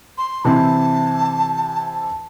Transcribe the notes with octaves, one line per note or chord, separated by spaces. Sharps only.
C6
C3 E3 C4 E4 A5